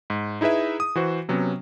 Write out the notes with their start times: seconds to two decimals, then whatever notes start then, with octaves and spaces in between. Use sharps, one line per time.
0.10 G#2
0.41 D#4 E4 G#4 B4 E5
0.80 D#6
0.95 E3 F#4 C5
1.29 C3 F#3 B3 C#4